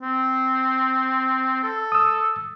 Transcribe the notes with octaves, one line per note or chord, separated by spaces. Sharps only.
C4
A4
D#6 E6